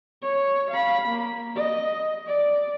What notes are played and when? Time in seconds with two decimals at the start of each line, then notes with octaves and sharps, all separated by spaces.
0.23 C#5
0.71 F5 B5
1.08 A#3
1.55 D#5
2.27 D5